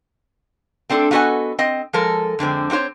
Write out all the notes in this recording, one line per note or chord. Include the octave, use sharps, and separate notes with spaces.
A3 C4 D4 A4
A3 B3 F#4 A4 D#5 G#5
C4 D#5
F3 G#3 A4 A#4
F2 D3 G#3 C4
C4 D#4 F#4 C5 C#5